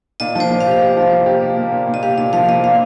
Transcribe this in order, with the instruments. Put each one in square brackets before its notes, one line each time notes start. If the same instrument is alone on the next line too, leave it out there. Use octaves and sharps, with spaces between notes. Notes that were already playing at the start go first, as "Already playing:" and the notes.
[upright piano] A#2 [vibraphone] D#5
[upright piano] F3 [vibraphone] C5
[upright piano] A#2
[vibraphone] F5
[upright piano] G4
G4
F3
A#3
G4
A#3
A#3
A#2
A#2
[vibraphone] D#5
[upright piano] G4 [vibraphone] F5
[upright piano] A#2 [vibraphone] D#5
[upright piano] F3 [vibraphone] F5
[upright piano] A#3 [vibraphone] D#5
[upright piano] A#2 [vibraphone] F5